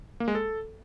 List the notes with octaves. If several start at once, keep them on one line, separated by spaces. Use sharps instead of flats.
A#3
G#3
A4